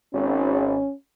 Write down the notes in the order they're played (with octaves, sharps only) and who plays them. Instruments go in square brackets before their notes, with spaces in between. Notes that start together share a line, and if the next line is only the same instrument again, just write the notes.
[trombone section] G#1 [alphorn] C#4